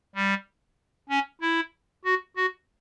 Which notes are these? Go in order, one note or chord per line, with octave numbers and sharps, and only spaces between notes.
G3
C#4
E4
F#4
F#4